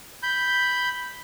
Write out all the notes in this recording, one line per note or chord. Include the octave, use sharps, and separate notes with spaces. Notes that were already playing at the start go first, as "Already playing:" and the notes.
B5 G6